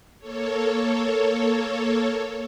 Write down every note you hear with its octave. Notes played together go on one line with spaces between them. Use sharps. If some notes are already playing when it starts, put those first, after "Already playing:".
A#3 A4 C#5